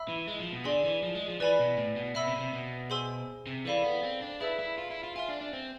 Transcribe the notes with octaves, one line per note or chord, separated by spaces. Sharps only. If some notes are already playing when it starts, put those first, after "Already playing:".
Already playing: E5 B5 E6
E3
G#3
F3
B2
D3 G#4 D5 G#5 C6
E3
F3
G#3
F3
E3 B4 D5 G#5 B5
B2
A2
B2
B2 E5 B5 E6
C3
B2
C3
B2
G#4 C5 G#5 C6 E6
C3
E3 A4 D5 F5 B5
B3
C4
D4
E4 G#4 B4 E5 A5 E6
E4
F4
E4
F4
F4 E5 G#5 C6 F6
D4
D4
C4